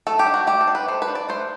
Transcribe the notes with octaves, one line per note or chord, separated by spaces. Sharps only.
A3 A4
G4
D4
F#4
A3 G4
A4
D4
B4
A3 C5
B4
D4
D5
A3 C5